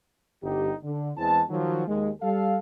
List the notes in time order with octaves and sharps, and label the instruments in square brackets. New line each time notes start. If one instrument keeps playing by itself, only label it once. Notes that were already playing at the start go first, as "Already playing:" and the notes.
[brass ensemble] G1 G3 D#4 G4
D3
E2 E3 G#3 C4 A5
D#3 F3 F#3
D#2 G#3
G3 A4 F5